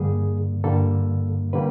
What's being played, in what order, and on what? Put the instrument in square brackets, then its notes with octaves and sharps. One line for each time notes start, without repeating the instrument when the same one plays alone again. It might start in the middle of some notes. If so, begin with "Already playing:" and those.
Already playing: [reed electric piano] G2 D3 G3 A#3 G#4
G2 D3 G3 A#3 A4
D3 G3 A#3 B4